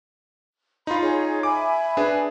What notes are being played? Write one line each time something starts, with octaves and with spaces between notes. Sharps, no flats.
D#4 F4 B5 C6
G#4 C#5
E5 G#5 B5 D6
D4 G#4 B4